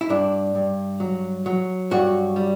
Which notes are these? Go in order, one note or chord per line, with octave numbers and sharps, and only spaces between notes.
E4
G2 D4
G2
F#3
F#3
G2 F#4
G3